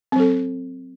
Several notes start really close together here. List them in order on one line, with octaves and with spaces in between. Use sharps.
C4 F#3 A4